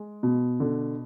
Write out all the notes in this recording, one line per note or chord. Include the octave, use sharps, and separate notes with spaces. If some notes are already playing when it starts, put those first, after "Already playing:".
Already playing: G#3
B2
D3